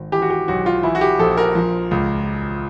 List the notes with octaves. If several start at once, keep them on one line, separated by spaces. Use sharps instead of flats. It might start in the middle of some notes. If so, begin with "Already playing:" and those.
Already playing: G#1
E3 G4
F#4
G4
B1 F#4
F4
E3 E4
F#4
G4
A#1 A4
A#4
F3
C#2